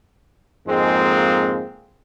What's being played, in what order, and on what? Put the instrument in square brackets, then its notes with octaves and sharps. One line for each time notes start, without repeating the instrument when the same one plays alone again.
[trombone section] F2 G#2 G#3 A#3 C4